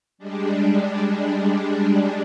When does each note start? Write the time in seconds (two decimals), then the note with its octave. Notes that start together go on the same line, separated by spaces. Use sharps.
0.18 G3 G#3 D4